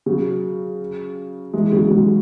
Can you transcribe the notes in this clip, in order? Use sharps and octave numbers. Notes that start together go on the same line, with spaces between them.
C#3 F#3
E3 G#3
C#3 F#3
G#2 C#3